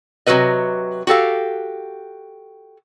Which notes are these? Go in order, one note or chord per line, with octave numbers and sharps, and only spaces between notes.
C3 F#3 F#4 A4 B4 D#5
F#4 G4 A4 F5